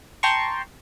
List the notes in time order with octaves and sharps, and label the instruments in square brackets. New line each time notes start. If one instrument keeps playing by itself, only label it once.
[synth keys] G5 A5 A#5 C6 C#6